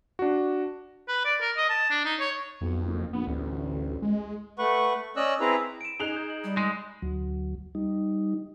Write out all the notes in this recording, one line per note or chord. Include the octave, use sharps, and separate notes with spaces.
D4 F#4
B4
D5
A#4
D#5
A5
D4
D#4
C#5
B1 F2
F#1
A#1 B3
A1 D2
G#3
A3 B4 F#5 C#6
C#4 D5 D#5 E6 F#6
C4 E4 G#4 B4 A#5
D7 E7
D#4 G#4 F#6 F7 G7
D#6 G6
F#7
G3
G#3 D#6
D2 F#3
G3 D#4